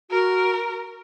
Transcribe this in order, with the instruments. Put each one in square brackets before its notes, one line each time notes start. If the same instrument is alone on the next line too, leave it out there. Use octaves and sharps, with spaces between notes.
[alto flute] F#4 [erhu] A#4